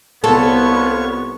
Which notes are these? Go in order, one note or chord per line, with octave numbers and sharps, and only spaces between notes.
C2 B3 F4 A4 C#5 C#6